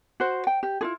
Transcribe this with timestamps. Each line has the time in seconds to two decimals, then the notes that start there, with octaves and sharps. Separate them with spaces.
0.20 F#4 C5
0.47 G5
0.63 G4
0.81 E4 F4 G#4